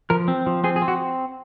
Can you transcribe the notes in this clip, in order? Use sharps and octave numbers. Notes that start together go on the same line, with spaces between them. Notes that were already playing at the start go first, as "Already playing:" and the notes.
F3 A#4
C4
F3
C4 G#4
G#4
C4
F#4